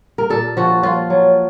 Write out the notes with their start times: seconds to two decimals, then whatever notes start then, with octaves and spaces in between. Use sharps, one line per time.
0.18 A#4
0.30 A#2 A4
0.57 F3 F#4
0.83 F3 F4
1.10 F#3